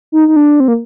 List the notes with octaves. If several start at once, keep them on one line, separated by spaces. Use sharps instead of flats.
D#4
D#4
D4
C4
A#3